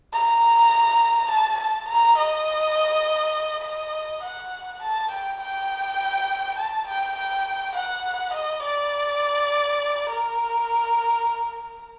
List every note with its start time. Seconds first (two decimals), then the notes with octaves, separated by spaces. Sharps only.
0.13 A#5
1.30 A5
1.60 A5
1.89 A#5
2.18 D#5
3.65 D#5
4.23 F#5
4.83 A5
5.11 G5
5.41 G5
6.58 A5
6.87 G5
7.17 G5
7.75 F#5
8.34 D#5
8.63 D5
10.10 A#4